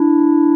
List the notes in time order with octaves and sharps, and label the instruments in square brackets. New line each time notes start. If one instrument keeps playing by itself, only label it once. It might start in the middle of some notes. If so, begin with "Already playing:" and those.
Already playing: [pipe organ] D4 E4